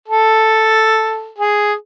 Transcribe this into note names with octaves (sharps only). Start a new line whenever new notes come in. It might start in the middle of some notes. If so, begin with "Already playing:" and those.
A4
G#4